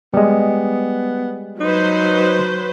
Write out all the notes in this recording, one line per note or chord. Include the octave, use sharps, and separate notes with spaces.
G3 G#3 B3
F#3 D#4 B4 C5